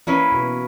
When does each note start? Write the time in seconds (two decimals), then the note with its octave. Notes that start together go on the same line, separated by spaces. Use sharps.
0.07 E3 A#3 C#4 E4 B4
0.32 B2